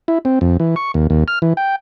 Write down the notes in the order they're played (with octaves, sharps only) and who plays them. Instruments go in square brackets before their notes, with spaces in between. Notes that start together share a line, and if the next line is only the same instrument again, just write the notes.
[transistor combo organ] E4
C4
F2
E3
C#6
D#2
D#2
F6
E3
G5